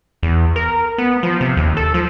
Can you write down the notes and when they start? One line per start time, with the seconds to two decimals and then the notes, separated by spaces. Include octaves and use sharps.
0.23 E2
0.56 A#4
0.98 B3
1.23 F3
1.41 C3
1.57 D#2
1.77 A4
1.94 F3